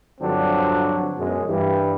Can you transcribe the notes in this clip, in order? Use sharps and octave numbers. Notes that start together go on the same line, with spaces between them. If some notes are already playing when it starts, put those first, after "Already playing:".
G2 D3 F3 F#3 C4 D4
F#2 B2 G#3
G2 E3 G3